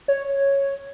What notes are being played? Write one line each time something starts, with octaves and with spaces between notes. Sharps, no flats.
C#5